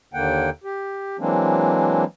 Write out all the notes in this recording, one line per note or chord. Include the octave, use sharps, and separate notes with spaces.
D#2 D3 A#3 F#5 G5
G4
E3 F#3 G#3 A#3 C4 D4